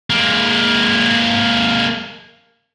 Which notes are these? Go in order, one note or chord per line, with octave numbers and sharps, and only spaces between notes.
G#3 A#3